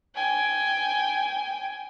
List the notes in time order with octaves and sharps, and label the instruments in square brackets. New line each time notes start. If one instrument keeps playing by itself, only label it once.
[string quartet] G5 G#5